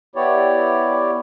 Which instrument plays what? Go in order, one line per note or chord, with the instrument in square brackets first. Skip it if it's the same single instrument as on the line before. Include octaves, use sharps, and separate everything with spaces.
[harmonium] B3 E4 G4 C#5 D5